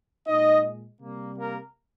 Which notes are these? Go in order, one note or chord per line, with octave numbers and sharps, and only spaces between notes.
A#2 G#3 D#4 D#5
C3 G3 A#3
A#3 A#4